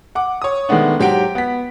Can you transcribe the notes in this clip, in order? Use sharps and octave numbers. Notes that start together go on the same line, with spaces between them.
F#5 D6
C#5 D#6
D#3 G#3 A3 B3 D4
G#2 F#3 G4 F#5 G5 D7
B3 B6